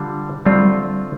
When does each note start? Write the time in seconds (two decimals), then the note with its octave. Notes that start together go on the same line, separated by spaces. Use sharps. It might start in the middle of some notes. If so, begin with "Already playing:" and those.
Already playing: D3 G3 F4
0.45 D3 G3 A3 C4 F4